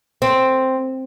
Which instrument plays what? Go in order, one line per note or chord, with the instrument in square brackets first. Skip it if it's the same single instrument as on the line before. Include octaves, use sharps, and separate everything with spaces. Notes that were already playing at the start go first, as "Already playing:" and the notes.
[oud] C4